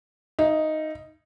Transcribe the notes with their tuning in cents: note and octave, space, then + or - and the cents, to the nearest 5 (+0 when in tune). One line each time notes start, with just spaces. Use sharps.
D#4 +0 E5 +35